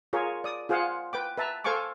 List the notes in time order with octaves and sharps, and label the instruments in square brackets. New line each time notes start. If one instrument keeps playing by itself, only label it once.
[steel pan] F4 G#4 A#4 C#5
D5 D#6
F4 G#4 C5 F5 F#5
B4 G5 D6
B4 E5 A5 A#5
A4 C5 F5 G#5 C#6 D6